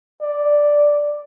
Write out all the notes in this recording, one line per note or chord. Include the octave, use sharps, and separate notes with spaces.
D5